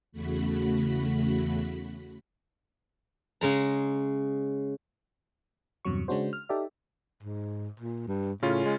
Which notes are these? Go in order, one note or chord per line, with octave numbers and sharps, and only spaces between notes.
E2 C#3 A3 F#4 B5
C#3 G#3 A#5
E2 G2 C3 F#3 C#6
C#3 G#3 C#4 D4 F#4 C5
F6
D#4 G4 A4 D5 E5
G#2
A#2
G2
A2 C#3 C#4 F4
G#3